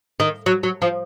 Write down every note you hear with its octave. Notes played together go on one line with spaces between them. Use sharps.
D#3
F#3
F#3
F3